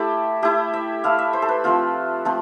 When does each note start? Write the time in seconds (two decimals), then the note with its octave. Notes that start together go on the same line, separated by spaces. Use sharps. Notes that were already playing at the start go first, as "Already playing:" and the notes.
Already playing: A3 E4 G4 A4
0.42 A3 E4 G4
0.73 E5
1.04 A3 E4 F5
1.18 E5
1.33 C5
1.42 A4
1.48 B4
1.64 F3 A3 C4 F4
2.25 F3 A3 C4